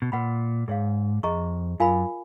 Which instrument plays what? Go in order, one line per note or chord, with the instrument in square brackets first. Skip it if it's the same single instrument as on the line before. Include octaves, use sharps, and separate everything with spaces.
[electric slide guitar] B2
[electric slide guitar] A#2 [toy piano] B4 F#5 B5
[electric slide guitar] G#2 [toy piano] G#4 C#5 F5
[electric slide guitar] F2 [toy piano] G#4 D#5 A#5 C#6
[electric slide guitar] F#2 [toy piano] F4 A#4 F5 G#5 B5